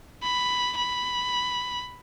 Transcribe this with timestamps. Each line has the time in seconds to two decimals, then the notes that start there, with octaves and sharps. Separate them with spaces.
0.23 B5
0.77 B5